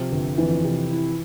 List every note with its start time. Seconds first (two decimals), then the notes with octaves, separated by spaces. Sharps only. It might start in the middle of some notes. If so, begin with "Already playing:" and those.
Already playing: C3 F3
0.12 G1
0.38 F2 E3
0.64 C3
0.91 E4